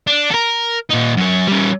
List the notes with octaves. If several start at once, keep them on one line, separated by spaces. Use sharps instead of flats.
D4
A4 A#4
A#2 D#4
F#2 C#5
G3 C#4